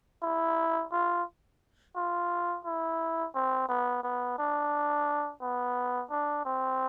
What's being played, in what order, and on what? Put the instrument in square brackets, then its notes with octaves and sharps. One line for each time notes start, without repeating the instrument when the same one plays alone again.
[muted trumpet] E4
F4
F4
E4
C4
B3
B3
D4
B3
D4
C4